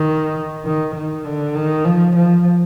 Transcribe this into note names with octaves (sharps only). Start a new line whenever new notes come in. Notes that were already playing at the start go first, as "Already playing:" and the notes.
Already playing: D#3
D#3
D#3
D3
D#3
F3
F3